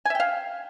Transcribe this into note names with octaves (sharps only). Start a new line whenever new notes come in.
E5 F5 G5 G#5